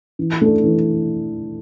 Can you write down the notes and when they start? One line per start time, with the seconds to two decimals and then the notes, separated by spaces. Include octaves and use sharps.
0.19 E3
0.41 A3 D4 A4
0.64 E3